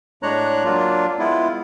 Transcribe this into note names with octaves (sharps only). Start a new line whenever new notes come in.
A2 G#3 D4 C#5 A#5 F#6
F#3 A#3 D4 F4
G#3 B3 E4 F4